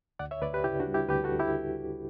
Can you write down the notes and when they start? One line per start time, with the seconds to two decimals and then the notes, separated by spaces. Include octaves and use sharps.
0.19 D2 D5 F#5
0.31 C#5 E5
0.42 D2 B4 D5
0.54 G4 B4
0.64 C#3 E4 G4
0.80 D4 F#4
0.87 G3
0.94 E4 G4
1.09 D2 G4 B4
1.24 F#4 A4
1.31 D2
1.39 E4 G4